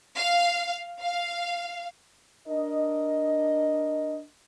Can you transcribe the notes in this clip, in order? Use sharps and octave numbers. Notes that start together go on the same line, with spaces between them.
F5
F5
D4 A#4 D#5